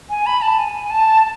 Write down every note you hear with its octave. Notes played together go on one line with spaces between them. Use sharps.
G#5
B5
A5
G#5
A5